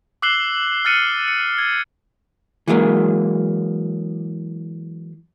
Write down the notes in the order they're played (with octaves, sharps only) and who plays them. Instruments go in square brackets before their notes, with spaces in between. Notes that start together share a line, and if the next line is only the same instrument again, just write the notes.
[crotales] D6 E6 F#6 C7 F#7 G7
F6 F#6 A6 C#7 D#7
C#7
G#6
[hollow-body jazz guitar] E3 F#3 G#3 A#3